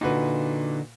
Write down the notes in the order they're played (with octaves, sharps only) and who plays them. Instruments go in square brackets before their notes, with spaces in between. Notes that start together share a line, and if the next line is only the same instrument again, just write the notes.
[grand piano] A#2 F#4 B4 [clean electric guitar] D3 D#4